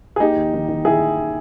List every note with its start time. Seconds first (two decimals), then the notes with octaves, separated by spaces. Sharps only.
0.16 G#4
0.20 A#3 D#4 G4
0.36 D#2
0.53 D#3
0.69 D#3
0.85 D#3 E4 G#4